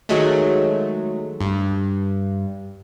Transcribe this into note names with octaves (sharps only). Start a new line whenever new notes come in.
D#3 F#3 G#3 A3
G2